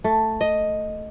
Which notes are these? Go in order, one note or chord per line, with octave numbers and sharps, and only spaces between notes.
A3
D#5